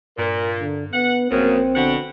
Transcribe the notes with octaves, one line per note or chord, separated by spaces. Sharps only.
G2 A#2 A#4
D3
B3 F#5
A#1 F#2 C#3 A#3 C4
B2 D3 F#5